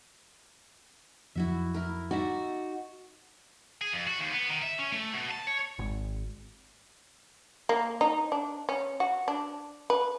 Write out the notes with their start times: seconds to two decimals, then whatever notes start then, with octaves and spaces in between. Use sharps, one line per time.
1.35 F2 F3 F#3 E4 F#4 E5
1.74 E4 A#4
2.11 D#4 F#4 D5 E5
3.81 G#4
3.93 F2
4.08 F#4
4.20 D#2
4.32 B3
4.50 D#3
4.63 E5
4.79 C#4
4.92 A3
5.14 B2
5.31 A5
5.47 C#5
5.79 G#1
7.69 A#3
8.01 D#4
8.32 D4
8.69 C#4
9.00 F#4
9.28 D4
9.90 B4